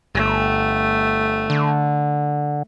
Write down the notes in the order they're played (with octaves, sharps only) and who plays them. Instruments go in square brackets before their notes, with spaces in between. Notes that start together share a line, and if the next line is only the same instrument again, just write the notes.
[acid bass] G1 [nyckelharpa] A3
[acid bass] D3